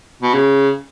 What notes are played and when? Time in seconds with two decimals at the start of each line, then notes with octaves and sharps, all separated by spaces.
0.22 B2
0.34 C#3